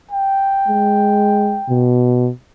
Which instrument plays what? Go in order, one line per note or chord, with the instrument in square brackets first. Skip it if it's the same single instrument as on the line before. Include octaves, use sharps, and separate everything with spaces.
[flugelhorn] G5
[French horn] G#3
B2